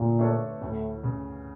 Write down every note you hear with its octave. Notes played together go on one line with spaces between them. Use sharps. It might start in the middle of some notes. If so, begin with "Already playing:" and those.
Already playing: A#2 D3
A3 D4 A4 C#5
D2 A2
C#3